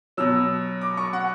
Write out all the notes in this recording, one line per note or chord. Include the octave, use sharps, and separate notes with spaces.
B2 F#3 E6
D6
C#6
F#5